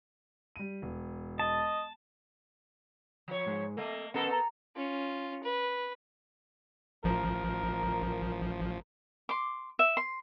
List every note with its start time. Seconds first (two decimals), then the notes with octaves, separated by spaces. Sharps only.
0.56 G3 D#7
0.82 E1
1.39 D#5 A5
3.28 F3 C#5
3.46 G#2 G#3
3.77 A3 A#3 A4 D#5
4.14 B3 C#4 A4 A#4 D#5 F#5
4.31 A#5
4.76 C#4 F4
5.44 B4
7.04 A1 F3 A#4
9.29 C6 D6
9.79 E5
9.97 C6